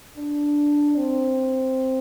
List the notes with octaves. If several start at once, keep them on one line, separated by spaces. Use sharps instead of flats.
D4
C4